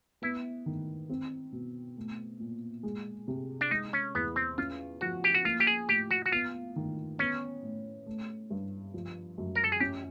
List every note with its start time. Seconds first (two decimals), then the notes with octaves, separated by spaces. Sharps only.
0.22 B3 E4
0.66 D#3
1.09 C4
1.52 B2
1.97 A3
2.40 A#2
2.83 G#3
3.28 C3
3.61 D4
3.71 G#3 D#4
3.93 C#4
4.15 E2 B3
4.36 C4
4.58 C#4 F4
5.01 F3 F#4
5.24 G4
5.34 F#4
5.45 A#3 F4
5.60 G4
5.67 G#4
5.89 A2 G4
6.11 F#4
6.26 F#4
6.32 B3 F4
6.76 D#3
7.19 B3 C#4
7.62 A2
8.06 A3
8.50 G2
8.94 F3
9.38 F#2
9.55 A#4
9.64 A4
9.72 G#4
9.80 C#4 G4